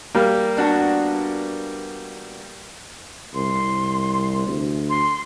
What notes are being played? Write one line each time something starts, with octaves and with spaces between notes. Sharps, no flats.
G3 A#3
B3 D4 F#4
C2 C6
D2
C6